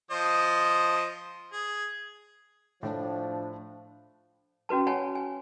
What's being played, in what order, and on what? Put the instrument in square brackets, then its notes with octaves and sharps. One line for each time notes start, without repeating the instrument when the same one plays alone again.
[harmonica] F3 C5 D#5
G#4
[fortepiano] A2 [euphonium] F3 [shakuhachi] D4
[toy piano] C#4 F#4 B4 A5
C#5 F#5 G#5 A5 B5
G#5